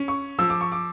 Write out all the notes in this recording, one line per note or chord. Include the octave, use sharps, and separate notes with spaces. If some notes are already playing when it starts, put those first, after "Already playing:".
Already playing: C#4
C#6
F3 E6
D6
C#6
D6